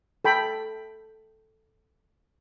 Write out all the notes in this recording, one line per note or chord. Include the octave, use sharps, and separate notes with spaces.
A4 G5 B5